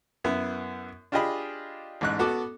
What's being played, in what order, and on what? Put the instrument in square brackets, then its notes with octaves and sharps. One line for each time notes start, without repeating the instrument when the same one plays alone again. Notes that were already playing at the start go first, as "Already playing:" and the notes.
[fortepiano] F#2 B3 E4
D4 F4 G4 G#4 D#5 B5
A1 G#2 F#6
B3 F#4 A4 D6